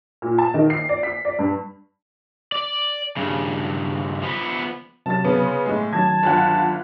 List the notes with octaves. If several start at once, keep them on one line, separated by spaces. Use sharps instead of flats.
A#2
A5
D#3
C7
D5
B6
D5
G2
D5
G2 C#3
F3 B3
C3 F#3 C#4 A5 A6
C#3 B3
C6
A2 G#3
D#3 F#3 C#4 A5 G#6
G1 F4 F#5